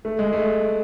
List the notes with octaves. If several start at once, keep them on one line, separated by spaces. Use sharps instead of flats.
A3
G#3
A3